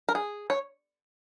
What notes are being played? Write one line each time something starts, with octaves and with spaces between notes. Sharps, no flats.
A#4
G#4
C#5